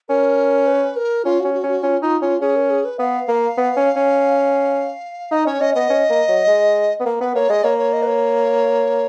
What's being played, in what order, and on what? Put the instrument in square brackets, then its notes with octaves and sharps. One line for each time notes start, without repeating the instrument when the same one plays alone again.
[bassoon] C#4 [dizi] A#4
[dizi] B4
A#4
[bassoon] C#4 [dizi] F4
[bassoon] C#4 [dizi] F#4
[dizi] F#4
[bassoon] C#4
[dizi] F#4
[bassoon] C#4 [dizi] F4
[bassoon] D#4 [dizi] F4
[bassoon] C#4 [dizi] F4
[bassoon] C#4 [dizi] G#4
[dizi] A#4
G#4
B4
[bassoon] B3 [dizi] F5
[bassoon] A#3
B3
C#4
C#4
[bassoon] D#4 [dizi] D#5
[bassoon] C#4 [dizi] C#5
[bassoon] C#4 [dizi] D#5
[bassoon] B3 [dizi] D#5
[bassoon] C#4
A#3
F#3
G#3
B3
A#3
[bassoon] B3 [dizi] B4
[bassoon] A#3 [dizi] C#5
[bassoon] G#3 [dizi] D#5
[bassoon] A#3 [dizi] C#5
[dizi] C#5
D#5
B4
C#5